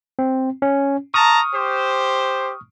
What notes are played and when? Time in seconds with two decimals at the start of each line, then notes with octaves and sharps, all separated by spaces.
0.19 C4
0.62 C#4
1.14 A5 A#5 C#6 D#6 F6
1.54 G4 C5